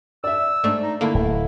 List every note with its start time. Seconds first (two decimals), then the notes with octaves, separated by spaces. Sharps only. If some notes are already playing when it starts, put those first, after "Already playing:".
0.24 D5 E5 E6
0.64 G#2 A3 D4
0.83 D#4
1.01 D3 A3 A#3 E4
1.15 D1